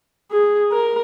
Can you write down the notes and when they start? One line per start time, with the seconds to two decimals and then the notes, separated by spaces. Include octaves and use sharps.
0.31 G#4
0.72 A#4